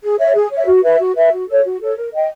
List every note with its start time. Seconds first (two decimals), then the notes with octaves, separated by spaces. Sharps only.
0.03 G#4
0.19 C#5 E5
0.35 G#4
0.51 C#5 E5
0.67 F#4
0.84 B4 E5
0.99 F#4
1.16 B4 E5
1.32 F#4
1.48 A4 C#5
1.64 F#4
1.81 A4 C#5
1.97 A#4
2.14 D#5 G5